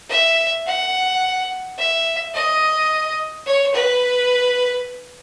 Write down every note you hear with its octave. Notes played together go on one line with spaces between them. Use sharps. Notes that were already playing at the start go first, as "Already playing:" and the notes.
E5
F#5
E5
D#5
C#5
B4